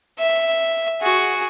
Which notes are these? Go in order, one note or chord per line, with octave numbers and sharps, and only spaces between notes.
E5
F#4 G#4